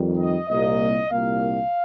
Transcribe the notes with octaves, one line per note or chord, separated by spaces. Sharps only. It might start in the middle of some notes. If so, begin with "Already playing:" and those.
Already playing: F2 D#3 G3
D#5
C2 A#2 A#3 D#5
C2 A#2 A#3 F5